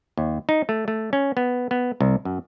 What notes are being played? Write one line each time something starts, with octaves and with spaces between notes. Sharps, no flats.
D#2
D#4
A3
A3
C#4
B3
B3
C2
F#2